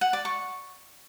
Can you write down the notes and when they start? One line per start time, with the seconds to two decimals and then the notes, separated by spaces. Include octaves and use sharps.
0.01 F#5
0.13 D5
0.25 C#6